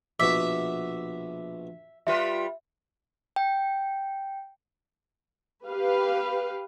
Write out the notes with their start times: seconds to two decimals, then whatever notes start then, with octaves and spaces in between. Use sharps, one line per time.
0.20 A#1 B2 F#4 E5 D6
2.07 G3 F4 B4 E5
3.36 G5
5.67 G4 B4 F5